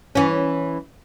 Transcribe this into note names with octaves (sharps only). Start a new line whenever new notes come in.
E3 C#4